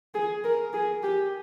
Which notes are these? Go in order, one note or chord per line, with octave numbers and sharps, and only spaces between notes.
G#4
A#4
G#4
G4